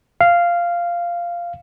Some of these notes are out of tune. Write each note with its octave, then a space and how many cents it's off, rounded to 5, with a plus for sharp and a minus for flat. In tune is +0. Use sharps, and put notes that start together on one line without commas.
F5 -10